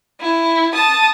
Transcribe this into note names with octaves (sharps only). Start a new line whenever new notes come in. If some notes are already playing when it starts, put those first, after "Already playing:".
E4
A5 D#6